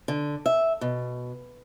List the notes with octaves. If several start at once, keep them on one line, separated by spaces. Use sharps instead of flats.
D3
E5
B2